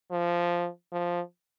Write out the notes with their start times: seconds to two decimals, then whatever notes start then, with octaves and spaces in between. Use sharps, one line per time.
0.11 F3
0.92 F3